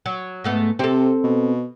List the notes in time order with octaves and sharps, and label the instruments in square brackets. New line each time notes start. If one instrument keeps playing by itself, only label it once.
[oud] F#3
G#2 A3 B3
[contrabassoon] C3 [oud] C4 A4
[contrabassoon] B2